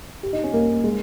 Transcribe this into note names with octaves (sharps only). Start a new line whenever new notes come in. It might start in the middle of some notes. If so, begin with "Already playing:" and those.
G4
D#4
C#4
A#3
G#3